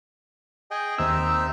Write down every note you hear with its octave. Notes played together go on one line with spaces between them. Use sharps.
G#4 D#5 G5
D#2 C4 D#4 E5 E6